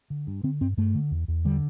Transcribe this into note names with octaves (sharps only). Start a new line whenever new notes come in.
D3
G2
D3 C4
G2 C4
G2 A3
D3
E2
E2
D3 G3